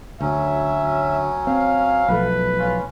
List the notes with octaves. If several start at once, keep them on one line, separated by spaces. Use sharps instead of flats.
D2 F#3 C#4 E5
C4 F5
B1 F3 A3 B4
C#4 F4